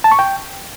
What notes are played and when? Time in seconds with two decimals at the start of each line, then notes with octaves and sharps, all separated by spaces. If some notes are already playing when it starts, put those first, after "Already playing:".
0.04 A5
0.12 C#6
0.19 G5